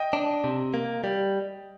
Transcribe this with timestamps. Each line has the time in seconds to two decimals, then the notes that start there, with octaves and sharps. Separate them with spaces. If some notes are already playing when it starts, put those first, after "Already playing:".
Already playing: D#5 G5
0.13 D4
0.44 C3
0.74 A#3
1.04 G3